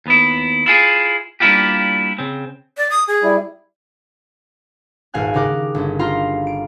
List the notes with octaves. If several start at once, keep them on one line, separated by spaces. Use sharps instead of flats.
D#2 B3 E4
E4 F4 G#4
G3 A#3 D4 E4 F4 G4
C#3 C4
D5
D#6
G#4
G3 E4
D#1 G#1 F5 G#5 F#6
C#3 D#4 G4 A#4 D6 F#6
G1 C#4
F4 G4 F5 A#5 C6
D7